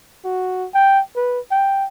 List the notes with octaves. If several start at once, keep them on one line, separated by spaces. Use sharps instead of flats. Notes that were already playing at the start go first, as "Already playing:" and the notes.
F#4
G5
B4
G5